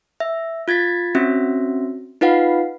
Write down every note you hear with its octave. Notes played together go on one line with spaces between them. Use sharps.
E5
F4 G#6 A6 B6
C4 C#4 F#4 E5
D#4 F4 B4 F5 F#5